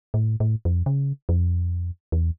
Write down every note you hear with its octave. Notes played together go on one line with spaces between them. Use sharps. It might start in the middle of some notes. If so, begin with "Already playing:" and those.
A2
A2
F2
C#3
F2
E2